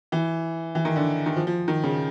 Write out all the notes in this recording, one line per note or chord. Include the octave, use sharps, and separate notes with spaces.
E3
E3
D#3
D3
D#3
F3
F3
D#3
C#3